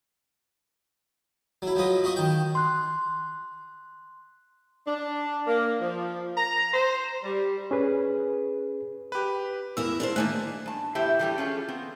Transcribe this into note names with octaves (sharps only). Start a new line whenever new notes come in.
F#3 E4
F3 F#3 B4 D#5
F4 F#4 D#5 C#6
D#3 G5
C6 F#6
D4
A#3
F3
A#5
C5
G3
C#4 G#4 B4
G4 B4
E2 E4 A#4 E6
D4 A#4 C5
D3 D#3 A3 A#3 G#5 F#6
G2 A5
E2 A2 E4 G4 C5 E5
E3 G3 A3 D#4 G4
C#4 F4 G#4 A4
B3 C4